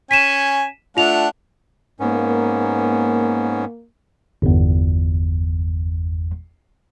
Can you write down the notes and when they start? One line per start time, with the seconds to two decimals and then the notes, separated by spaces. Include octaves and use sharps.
0.11 C#4 G#5 B6 D#7 E7
0.97 A3 D4 F4 F#5 F7
2.00 G#2 A#3 B3 C#4
4.42 G1 E2